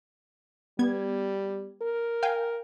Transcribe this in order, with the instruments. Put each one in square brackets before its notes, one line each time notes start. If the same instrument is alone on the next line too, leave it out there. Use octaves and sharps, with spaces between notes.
[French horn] G3 [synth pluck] B3 G#6
[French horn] A#4
[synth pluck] F5 G5 G#5